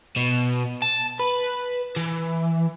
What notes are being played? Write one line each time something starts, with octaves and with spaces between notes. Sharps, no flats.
B2
A5
B4
E3